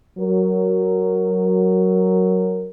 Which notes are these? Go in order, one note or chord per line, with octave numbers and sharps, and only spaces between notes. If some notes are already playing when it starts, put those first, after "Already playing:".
F#3 A#4